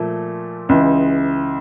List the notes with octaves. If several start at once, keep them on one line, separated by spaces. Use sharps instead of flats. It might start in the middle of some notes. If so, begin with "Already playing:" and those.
Already playing: A#2 F3 A3
C#2 C#3 E3